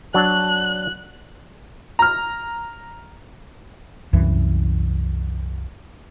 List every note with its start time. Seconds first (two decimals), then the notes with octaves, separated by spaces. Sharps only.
0.14 F#3 D4 F#6
1.99 A#5 F6
4.13 C2 F#2 E3